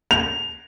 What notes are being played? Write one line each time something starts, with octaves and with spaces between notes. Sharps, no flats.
F7